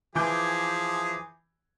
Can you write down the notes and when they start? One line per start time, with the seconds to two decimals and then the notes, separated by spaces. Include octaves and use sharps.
0.15 E3 F3 G#4 G#5 D6 G6